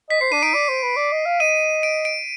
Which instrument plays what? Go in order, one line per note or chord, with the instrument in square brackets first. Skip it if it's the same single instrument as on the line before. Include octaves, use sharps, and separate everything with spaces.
[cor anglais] D#5 [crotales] B6
[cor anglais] C5 [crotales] C7
[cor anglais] D4 [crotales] D#7
[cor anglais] D#4 [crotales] D7
[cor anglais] D5
C5
B4
D5
D#5
F5
[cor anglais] D#5 [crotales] D#7
[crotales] D7
D7